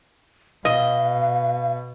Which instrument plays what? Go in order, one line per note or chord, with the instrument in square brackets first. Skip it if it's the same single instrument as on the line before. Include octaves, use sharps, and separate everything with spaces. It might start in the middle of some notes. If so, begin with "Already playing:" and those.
[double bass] B2 [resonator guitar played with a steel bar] D#5 [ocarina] F5